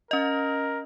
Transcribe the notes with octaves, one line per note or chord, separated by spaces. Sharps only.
C#4 A#4 D#5